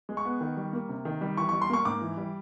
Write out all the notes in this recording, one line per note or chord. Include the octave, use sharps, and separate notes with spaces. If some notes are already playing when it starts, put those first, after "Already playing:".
G#3
C#6
B3
D#3
G3
A#3
C3
D#3
G3
E3 C#6
G3 C#6
C6
A#3 C#6
G#2 D6
E3
G3